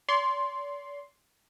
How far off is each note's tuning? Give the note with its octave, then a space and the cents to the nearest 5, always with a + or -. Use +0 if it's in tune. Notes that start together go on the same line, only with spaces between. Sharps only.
D5 -45 C6 +0